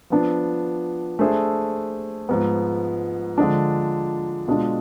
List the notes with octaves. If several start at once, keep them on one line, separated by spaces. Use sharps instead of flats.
F3 B3 D4
A3 D4 G#4 C5 E5
G#2 F3 B3
D3 F3 G#3 D4
B2 G#3 D4 F4